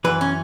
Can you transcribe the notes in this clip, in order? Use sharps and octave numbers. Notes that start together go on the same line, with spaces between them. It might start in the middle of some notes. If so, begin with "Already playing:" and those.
F#2 E3 B4
C#4